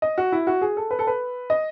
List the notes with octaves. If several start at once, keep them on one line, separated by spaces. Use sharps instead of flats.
D#5
F#4
E4
F#4
G#4
A4
B4
A4
B4
D#5